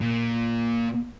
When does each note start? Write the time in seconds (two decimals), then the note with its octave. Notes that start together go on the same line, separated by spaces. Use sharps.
0.01 A#2